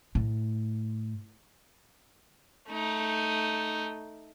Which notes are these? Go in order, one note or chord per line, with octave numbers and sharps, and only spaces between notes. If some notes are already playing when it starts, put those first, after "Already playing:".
A2
A3 D#4